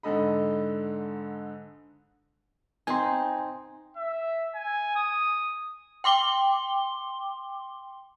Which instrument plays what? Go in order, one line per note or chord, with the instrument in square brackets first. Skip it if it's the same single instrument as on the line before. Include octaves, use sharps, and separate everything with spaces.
[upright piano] G#2 D3 A4 D#5 B5
[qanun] C4 D#4 [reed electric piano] G#5 C6
[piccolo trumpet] E5
G#5
D#6
[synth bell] G5 C6 D6 G7